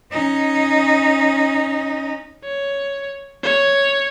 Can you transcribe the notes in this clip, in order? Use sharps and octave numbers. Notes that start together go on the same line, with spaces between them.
C#4 D#4
C#5
C#5